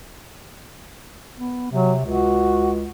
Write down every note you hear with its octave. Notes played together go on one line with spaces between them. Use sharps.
B3
C3 F#3
C#2 F#4